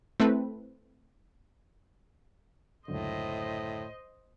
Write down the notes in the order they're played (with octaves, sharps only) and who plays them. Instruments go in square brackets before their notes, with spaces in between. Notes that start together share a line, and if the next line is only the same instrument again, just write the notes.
[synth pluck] A3 C4 E4 A4 B4
[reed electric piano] C#2 F#2 D3 [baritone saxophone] A2 [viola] C5 D#5